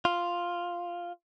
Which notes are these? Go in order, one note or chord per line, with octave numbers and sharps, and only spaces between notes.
F4